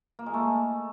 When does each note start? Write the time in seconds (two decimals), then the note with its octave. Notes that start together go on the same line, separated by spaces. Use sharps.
0.19 A#3
0.26 G#3
0.34 A3